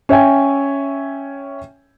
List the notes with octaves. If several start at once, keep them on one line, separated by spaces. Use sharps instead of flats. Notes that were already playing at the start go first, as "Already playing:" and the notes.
C#4 C#5 E5 G5 G#5